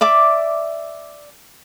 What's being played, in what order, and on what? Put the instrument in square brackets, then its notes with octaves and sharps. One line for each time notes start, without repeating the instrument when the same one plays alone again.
[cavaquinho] D5 E5 D6